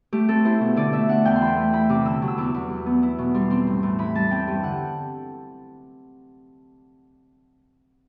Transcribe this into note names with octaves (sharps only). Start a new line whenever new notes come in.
A3 G4
C4 A4
E4 C5
B2
D3 D5
A3 E5
D4 F#5
E2 G5
C6
E3 B5
A3
E4 B5
C3 D6
D3 E6
F#3
E6
E2 D6
E2
F#3
B3
E4
B2
G3 C6
C4 C6
A2
A2
E3 B5
G3 A5
C4 G5
G2
D3 F#5